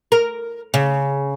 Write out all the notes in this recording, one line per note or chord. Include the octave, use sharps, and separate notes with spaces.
A#4
C#3